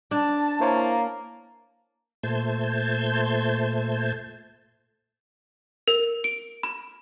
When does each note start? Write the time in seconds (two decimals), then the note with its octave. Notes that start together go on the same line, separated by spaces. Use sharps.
0.11 D4 A5
0.60 A#3 E4 C5 C#5
2.23 A#2 A3 C5 A5 G6 G#6
5.88 A#4
6.24 D7
6.63 B5